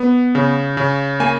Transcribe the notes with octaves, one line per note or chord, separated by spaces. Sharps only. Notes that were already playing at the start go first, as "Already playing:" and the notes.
Already playing: B3
C#3
C#3
A#3 G#5